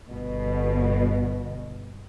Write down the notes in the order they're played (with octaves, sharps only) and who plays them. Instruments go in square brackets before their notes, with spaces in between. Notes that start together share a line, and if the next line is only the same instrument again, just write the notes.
[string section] G1 B2